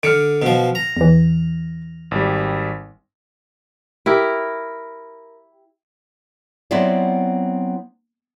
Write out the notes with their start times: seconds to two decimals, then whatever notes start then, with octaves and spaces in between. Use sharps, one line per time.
0.03 D3 F6 C#7 D7
0.42 B2 F3
0.75 A#5
0.96 E2 E3
2.11 G#1 G3
4.06 E4 G4 A#4
6.71 F#3 B3 C4 E4 F4 D5